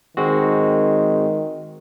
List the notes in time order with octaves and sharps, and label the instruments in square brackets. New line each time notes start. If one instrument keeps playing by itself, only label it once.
[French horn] D#3 [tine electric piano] G#3 C4 F#4